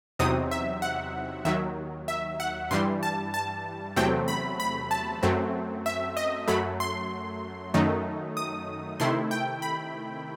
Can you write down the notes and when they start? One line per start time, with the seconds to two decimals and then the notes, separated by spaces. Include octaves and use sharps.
0.19 E2 C3 F#3 C4 D#4 D#6
0.51 E5
0.82 F#5
1.45 D#2 D#3 F#3 E5
2.08 E5
2.40 F#5
2.71 G2 E3 G3 C6
3.03 A5
3.34 A5
3.96 E2 C3 F#3 A3 C4 G5
4.28 B5
4.60 B5
4.91 A5
5.23 F#2 F#3 A3 C4
5.86 E5
6.17 D#5
6.48 F#2 F#3 A3 B5
6.80 C6
7.74 F#2 D#3 F#3 A3 D#4
8.37 D#6
9.00 C3 D#3 A3 E4 C6
9.31 G5
9.62 B5